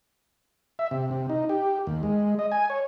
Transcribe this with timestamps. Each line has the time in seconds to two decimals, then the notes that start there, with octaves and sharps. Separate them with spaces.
0.79 E5
0.91 C3
1.11 C3
1.30 D#4
1.49 G4
1.87 D#2
2.03 G#3
2.39 D#5
2.52 G#5
2.70 C#5